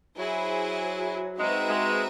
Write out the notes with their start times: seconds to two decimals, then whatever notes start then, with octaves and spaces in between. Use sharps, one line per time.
0.16 F#3 E4 G#4 C5
1.37 G#3 C4 D#4 F#4 B4 E5
1.69 G#3